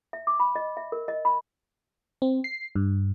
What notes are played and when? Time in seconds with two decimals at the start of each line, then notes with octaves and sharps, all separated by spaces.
0.13 E5
0.27 D6
0.40 B5
0.56 D#5
0.77 E5
0.92 A#4
1.08 D#5
1.25 B5
2.22 C4
2.44 C7
2.75 G2